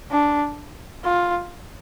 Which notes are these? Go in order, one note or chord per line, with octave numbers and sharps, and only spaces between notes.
D4
F4